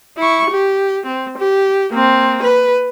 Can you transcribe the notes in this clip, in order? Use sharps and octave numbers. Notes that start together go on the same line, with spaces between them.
E4 C#6
G4
C4
G4
A#3 C4
B4